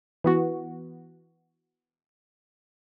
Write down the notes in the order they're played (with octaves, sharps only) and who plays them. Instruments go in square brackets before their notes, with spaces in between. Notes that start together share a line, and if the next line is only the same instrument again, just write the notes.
[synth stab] E3 B3 F#4